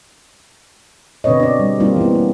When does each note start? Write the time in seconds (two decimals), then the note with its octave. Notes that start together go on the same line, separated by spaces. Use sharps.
1.24 B2 D3 C4 B4 C#5 D#5
1.40 D4 D5
1.60 G3
1.80 G3 A#3 C4 D#4 F4
1.96 E3 B3
2.11 A#3 C#4